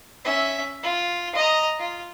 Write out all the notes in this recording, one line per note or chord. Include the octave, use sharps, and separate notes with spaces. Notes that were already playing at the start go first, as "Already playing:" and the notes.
C#4 E5
F4
D#5 A#5
F4